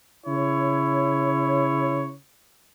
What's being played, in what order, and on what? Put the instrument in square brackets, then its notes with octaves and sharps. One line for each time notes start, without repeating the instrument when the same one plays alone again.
[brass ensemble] C#3 E4 C#5